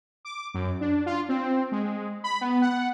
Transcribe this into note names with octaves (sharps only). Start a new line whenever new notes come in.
D6
F#2
D4
F4
C4
G#3
B5
B3
F#5